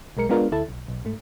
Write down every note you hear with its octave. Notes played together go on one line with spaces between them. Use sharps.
B1 G#3 A#4 C#7
G#3 B3 D4 F4 A#4
D2 E4 A4 A5
B1
B1
G#2 A3